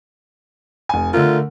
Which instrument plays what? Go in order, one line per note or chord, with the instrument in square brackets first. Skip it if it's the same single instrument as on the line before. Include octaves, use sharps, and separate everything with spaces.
[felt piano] F1 G#5
[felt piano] D3 A3 A#4 [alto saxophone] F4